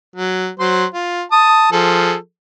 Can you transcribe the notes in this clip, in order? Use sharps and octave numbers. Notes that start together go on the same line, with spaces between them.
F#3
F#3 C5 C6
F4
A5 D#6
F3 G#4 A4